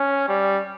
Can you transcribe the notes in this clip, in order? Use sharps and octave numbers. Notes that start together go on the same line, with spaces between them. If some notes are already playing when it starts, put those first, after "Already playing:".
Already playing: C#4
G3